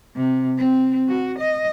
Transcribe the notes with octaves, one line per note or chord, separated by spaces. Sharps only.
C3
C4
F#4
D#5